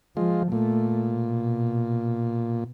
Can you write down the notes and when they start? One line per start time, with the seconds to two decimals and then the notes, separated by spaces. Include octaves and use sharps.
0.17 F3 G#3 F4
0.52 A#2 A3
1.07 B2